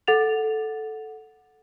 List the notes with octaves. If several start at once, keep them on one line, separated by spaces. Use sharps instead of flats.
A4 F#5 A6 F7